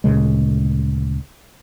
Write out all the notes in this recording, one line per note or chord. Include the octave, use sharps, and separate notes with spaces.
D2 A#2 C#3 G#3